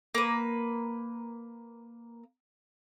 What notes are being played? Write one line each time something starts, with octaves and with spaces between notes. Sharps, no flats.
A#3 B4